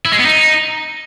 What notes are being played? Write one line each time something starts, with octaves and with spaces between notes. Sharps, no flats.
E4
G#3
B3
D#4